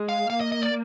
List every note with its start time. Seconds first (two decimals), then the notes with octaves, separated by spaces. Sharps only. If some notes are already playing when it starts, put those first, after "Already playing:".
Already playing: G#3
0.09 F5
0.30 A#3 F5
0.41 D#5
0.52 D#5
0.62 D5